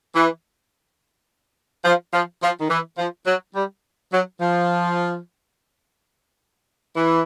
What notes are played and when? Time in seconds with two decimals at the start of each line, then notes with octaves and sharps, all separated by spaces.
0.14 E3
1.85 F3
2.13 F3
2.41 F3
2.59 D#3
2.69 E3
2.98 F3
3.26 F#3
3.54 G3
4.11 F#3
4.40 F3
6.95 E3